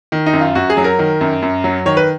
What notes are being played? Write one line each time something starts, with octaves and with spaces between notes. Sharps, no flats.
D#3
D#4
F#2
F4
F#2 F#4
G#4
F#3
A#4
D#3
F#2
F#2
F#3
D#3 C#5
B4